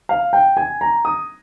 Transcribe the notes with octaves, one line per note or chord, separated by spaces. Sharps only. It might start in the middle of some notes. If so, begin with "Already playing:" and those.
F5
G5
G#5
A#5
D#6